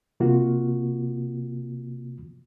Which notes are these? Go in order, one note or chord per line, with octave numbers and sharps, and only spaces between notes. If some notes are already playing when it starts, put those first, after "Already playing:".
C3 A#3 F4 F#4